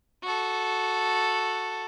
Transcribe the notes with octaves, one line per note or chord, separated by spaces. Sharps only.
F#4 A4